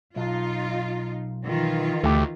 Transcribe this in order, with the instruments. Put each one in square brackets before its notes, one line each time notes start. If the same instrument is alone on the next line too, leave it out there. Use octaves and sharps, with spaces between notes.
[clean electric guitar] B1 [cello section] D#4 F4
[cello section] D#3 E3 F4
[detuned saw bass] D2 [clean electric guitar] A3 G4